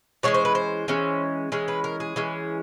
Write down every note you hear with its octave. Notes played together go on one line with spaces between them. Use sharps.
E3 G#3 C#4 C#5
C5
B4
C5
E3 G#3 C#4
E3 G#3 C#4
B4
A#4
G#4
E3 G#3 C#4